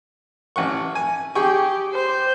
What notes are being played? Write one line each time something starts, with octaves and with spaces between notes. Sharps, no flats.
A1 F#5 C#6
G#5
G4 G#4 G5 C#6
C5